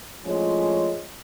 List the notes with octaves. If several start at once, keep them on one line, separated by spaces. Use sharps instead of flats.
A2 F3 G#3 C#4